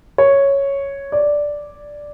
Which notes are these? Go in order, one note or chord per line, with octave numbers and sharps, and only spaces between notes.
C#5
D5